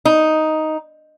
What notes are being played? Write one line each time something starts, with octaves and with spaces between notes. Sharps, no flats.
D#4